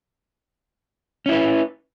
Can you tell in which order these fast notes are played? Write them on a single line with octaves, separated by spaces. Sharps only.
C#4 E4 B4